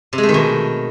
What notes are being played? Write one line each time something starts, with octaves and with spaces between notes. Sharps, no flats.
C3
G#3
A3
D#3
B2